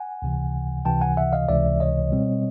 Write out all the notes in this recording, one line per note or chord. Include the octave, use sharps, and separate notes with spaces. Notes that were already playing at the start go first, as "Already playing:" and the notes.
Already playing: F#5 G#5
C#2 C3 E3
C#2 C3 E3 G5 A5
F#5 G#5
E5 F#5
D#5 F5
C#2 C3 E3 D5 E5
C#5 D#5
B2 G3 C4